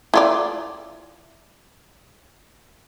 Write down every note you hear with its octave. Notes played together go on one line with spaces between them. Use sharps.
E4 F4 D5